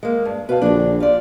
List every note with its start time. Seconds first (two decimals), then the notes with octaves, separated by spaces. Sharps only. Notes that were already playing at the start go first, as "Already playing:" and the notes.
0.03 G#3 A#3
0.25 G2
0.49 B2 B4 F5 A5
0.62 A#1 D3 D#3 D4
1.00 F4 G4 D5